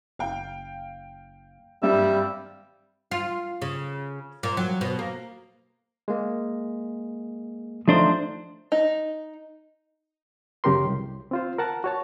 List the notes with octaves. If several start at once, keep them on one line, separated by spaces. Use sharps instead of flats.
F#1 F5 G5
G#1 G2 F#3 G3 C4 E5
F4
C#3
A#2
F#3
B2
A#3
G#3 A#3
F3 A3 D4 D#4 F4 C5
D#4
F#2 C#3 G4 A#4 C6
C2
C4 F4 C5
A#4 F#5 A5
F#4 C#5 A5